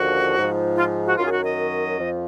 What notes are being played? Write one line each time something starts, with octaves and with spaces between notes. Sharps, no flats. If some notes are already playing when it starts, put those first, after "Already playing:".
Already playing: D#2 D3 F3 F#4
G#2 F3
F4
F#4
F#2 D#3 F#3 F4
G#4
F#4
D#5
F2 F3